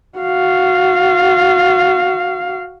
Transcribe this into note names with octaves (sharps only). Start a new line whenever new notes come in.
F#4 F5